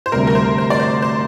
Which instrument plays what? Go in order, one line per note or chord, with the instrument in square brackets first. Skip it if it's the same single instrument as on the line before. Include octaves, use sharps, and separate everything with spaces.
[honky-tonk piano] C5
[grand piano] D2 C3 G3 [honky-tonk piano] A#4
[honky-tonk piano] A#4
C5
C5
D5
C5
C5